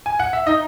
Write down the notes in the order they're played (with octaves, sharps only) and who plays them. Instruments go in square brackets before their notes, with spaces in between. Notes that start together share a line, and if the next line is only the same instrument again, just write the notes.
[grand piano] G#5
F#5
E5
[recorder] D#4 [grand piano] D#5